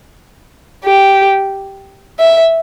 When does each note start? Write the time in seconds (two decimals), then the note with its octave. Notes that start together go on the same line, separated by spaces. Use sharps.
0.85 G4
2.19 E5